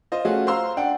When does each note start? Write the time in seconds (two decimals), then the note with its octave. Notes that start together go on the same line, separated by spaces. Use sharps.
0.12 F4 C5 D#5
0.25 A3 C#4 F4 F#4 G#4
0.47 C5 F5 A#5 C6 E6
0.77 D4 F#5 G5